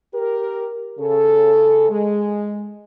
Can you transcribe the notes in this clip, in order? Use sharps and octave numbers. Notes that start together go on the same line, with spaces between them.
G4 A#4
C#3 A4
G#3